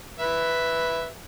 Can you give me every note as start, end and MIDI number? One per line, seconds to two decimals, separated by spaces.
0.20 1.08 71
0.20 1.08 76